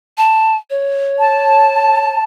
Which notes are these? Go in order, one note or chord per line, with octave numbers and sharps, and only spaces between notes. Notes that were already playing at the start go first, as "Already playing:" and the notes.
A5
C#5
A5